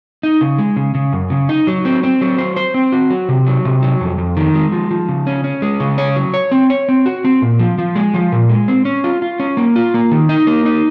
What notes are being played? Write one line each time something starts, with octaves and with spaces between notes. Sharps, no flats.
D#4
C#3
G#3
C#3
C#3
F#2
C#3
D#4
F#3
C4
C4
F#3
C5
C5
C4
F#4
F#3
C3
F#3
C3
F#3
F2
F2
D#3
G#3
F3
F3
C#3
C#4
C#4
G#3
C#3
C#5
F#3
C#5
C4
C#5
C4
F#4
C4
A#2
F3
F3
G#3
F3
A#2
G#3
C4
C#4
F4
F4
C#4
A#3
F4
A#3
D#3
D#4
A#3
D#4